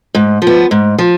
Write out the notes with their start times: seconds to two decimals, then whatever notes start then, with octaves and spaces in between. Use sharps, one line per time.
0.15 G#2
0.42 F3
0.47 B3
0.71 G#2
0.98 F3